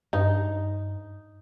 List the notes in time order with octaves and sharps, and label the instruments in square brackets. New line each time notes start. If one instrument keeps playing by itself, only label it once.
[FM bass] G2 [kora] D#4